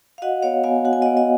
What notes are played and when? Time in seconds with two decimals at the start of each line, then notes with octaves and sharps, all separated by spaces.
0.18 F5
0.22 F#4 D#5 F#5
0.43 B3 C#5 F5
0.64 B3 F5 G#5
0.85 F#4 F#5
0.93 G#5
1.02 B3 D#5 F#5
1.17 D#5 F#5